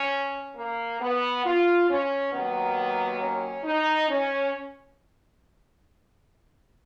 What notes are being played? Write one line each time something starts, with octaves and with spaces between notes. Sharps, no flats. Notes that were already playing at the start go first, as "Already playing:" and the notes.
Already playing: C#4
A#3
B3
F4
C#4
D#2 D#3 F#3 A#3 B3
C#4
D#4
C#4